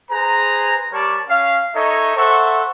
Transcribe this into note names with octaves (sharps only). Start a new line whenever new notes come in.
G#4 B4 C5 A#5
G3 A#4 C#5 D5 A5
C#4 F5
D#4 A4 C#5 D#5 E5
A4 C5 E5 F#5 C#6